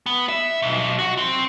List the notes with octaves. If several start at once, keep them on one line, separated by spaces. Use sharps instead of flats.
B3
E5
B1
F#4
C4